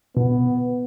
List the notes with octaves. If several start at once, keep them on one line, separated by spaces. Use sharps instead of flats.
B2 B3